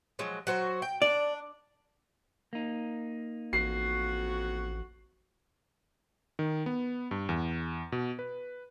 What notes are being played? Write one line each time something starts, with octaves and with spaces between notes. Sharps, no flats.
F3 F#3 G#3
F#3 F#4 C5
G5
D4 D5
A#3 D#4
A1 F2 F#4 C7
D#3
B3
G2
E2
B2
B4